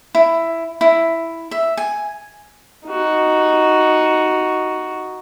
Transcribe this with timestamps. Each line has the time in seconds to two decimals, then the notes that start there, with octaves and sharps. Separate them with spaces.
0.15 E4
0.81 E4
1.51 E5
1.77 G#5
2.88 D#4 F#4